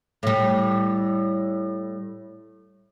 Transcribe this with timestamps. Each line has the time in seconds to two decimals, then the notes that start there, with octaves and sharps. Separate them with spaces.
0.23 A2 G3